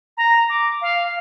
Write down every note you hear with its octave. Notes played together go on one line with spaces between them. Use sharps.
A#5
D6
F5